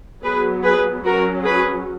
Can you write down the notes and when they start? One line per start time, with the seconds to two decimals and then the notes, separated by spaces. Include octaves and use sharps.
0.23 F#3 B3 G#4 B4
0.63 G#4 B4
1.04 F#3 C#4 F#4 A#4
1.44 G#4 B4